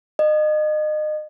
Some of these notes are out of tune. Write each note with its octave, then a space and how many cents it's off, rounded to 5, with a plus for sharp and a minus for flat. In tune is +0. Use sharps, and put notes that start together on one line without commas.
D#5 -30